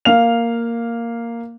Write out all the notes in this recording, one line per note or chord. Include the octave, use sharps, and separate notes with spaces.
A#3 F5 F7